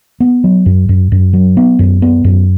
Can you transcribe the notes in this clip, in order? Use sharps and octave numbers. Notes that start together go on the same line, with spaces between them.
B3
F#3
F#2
F#2
F#2
F#3
B3
F#2
B3
F#2